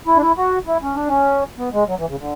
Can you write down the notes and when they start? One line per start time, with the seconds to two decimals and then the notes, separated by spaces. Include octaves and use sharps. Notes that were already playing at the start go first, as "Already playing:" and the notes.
0.07 E4
0.17 D4
0.22 E4
0.37 F#4
0.67 E4
0.82 C#4
0.96 D4
1.09 C#4
1.58 B3
1.73 G#3
1.88 F#3
1.99 E3
2.09 C#3
2.19 D3